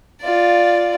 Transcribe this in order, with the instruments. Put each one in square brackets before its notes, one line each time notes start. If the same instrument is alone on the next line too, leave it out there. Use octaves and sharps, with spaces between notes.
[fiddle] F4 D5